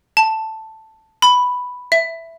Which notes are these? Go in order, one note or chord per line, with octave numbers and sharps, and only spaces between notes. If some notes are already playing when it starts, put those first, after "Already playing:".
A5
B5
E5